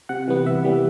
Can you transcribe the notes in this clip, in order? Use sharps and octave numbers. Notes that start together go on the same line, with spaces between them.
C3 F#5
E3 G3 B3
C3 E5
E3 G3 B3